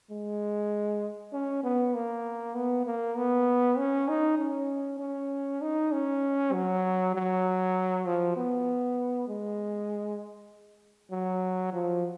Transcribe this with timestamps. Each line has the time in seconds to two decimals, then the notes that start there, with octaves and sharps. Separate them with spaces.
0.11 G#3
1.33 C#4
1.64 B3
1.94 A#3
2.55 B3
2.86 A#3
3.17 B3
3.78 C#4
4.08 D#4
4.39 C#4
5.00 C#4
5.61 D#4
5.92 C#4
6.53 F#3
7.15 F#3
8.06 F3
8.36 B3
9.28 G#3
11.12 F#3
11.73 F3